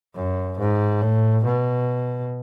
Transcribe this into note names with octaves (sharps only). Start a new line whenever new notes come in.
F#2
G#2
A2
B2